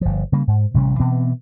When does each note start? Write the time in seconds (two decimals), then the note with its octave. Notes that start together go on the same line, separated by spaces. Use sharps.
0.01 G1 F3
0.32 C#3 G3 A#3
0.47 G#2
0.74 A1 C3 G3 C#4
1.00 B2 E3 B3 C4